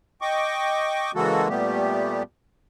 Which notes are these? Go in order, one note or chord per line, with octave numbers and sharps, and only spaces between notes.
D#5 G5 C#6 D6
C#3 E3 G#3 A#3 F#4 A4
A#2 G3 A3 B3 G4